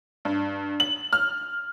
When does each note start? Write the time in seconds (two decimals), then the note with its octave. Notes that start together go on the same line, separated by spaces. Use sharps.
0.25 G2
0.80 F#7
1.13 F6